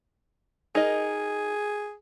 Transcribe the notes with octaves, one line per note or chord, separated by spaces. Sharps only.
D#4 G#4 A#4 D#5